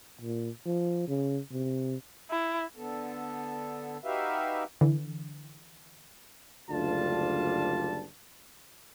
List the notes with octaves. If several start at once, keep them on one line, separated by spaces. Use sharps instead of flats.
A#2
F3
C#3
C3
E4
D3 B3 A4
D#4 F#4 G4 B4 E5 F5
D3 E3
F#1 D2 G3 D4 F4 A5